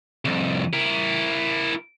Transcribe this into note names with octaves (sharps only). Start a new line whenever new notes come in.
C2 F2
E4 A#4